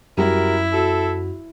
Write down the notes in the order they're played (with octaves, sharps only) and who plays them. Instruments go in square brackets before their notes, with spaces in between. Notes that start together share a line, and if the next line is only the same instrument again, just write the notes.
[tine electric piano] F#2 [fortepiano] F#3 G3 [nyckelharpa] E4 [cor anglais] A#4
[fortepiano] F#3 [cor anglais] A4